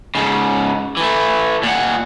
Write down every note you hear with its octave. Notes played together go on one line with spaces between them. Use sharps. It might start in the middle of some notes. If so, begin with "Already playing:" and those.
G#2 C#3
E3 A3
A#2 F#5